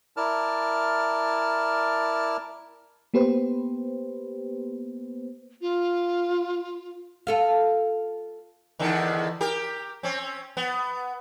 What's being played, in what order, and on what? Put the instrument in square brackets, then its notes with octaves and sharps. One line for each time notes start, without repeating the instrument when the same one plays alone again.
[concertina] E4 A#4 D5 A5 F6
[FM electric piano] A#3 B3 G4 B4 C5
[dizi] F4
[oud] F4 A4 F5
[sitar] E2 D3 D#3
G4 A#4
C4 C#4
B3